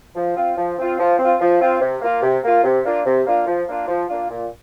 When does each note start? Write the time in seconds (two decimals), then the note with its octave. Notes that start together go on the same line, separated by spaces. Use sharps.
0.16 F3
0.37 C4 F4
0.58 F3
0.78 C4 F4
0.99 F3
1.19 C4
1.24 F4
1.40 F3
1.61 C4 F4
1.81 C3
2.02 A#3 F4
2.22 C3
2.44 A#3 F4
2.64 C3
2.85 A#3 D4 F4
3.06 C3
3.26 A#3 D4 F4
3.47 F3
3.68 A#3 D4 F4
3.88 F3
4.09 A#3 D4 F4
4.30 A#2